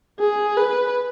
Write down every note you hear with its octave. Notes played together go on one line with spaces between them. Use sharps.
G#4
B4